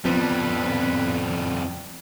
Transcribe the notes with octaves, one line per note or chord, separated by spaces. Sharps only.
F2 F3 G3 B3 C4 B4